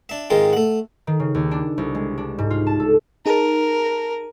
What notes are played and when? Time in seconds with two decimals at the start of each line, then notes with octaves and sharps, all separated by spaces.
0.09 D4 E5
0.30 G#2 D#3 G#3 C4 F4
0.53 A3 F#5
1.07 D#3
1.20 C#3
1.34 D#2
1.51 D4
1.78 C2
1.95 G#3
2.18 D4
2.38 G#2
2.50 F4
2.67 A5
2.80 A4
3.26 D#4 G#4 A#4 A5